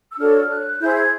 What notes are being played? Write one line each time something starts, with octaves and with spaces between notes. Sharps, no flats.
E6
D4 F#4 A4 C#5 F6
F#6
E4 G#4 C5 G6
G#6